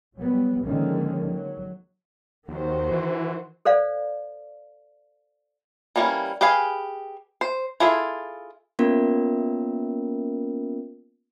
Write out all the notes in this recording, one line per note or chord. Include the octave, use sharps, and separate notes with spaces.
F#3 G3 B3
D3 D#3 F3 G#3 A#3 C#4
F#3
D#2 D#3 F#4 C5
E3
A4 C5 D5 F5
E3 G3 A#3 C4 C#4
G4 G#4 B4 F5 G#5
C5
E4 F4 G#4 A4 E5
A#3 B3 C#4 F4 A#4